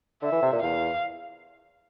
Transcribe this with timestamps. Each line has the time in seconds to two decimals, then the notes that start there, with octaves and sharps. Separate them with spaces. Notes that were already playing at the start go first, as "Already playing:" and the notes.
0.22 D3 E5
0.32 E3
0.42 C3
0.53 A#2
0.62 E2 F5